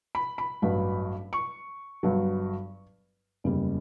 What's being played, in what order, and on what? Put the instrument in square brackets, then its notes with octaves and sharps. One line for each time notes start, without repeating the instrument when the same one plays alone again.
[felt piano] B5
B5
A1 G2 F#3
C#6
G1 G2 F#3
F#1 E2 C#3 G3